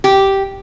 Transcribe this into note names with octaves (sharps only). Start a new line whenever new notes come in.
G4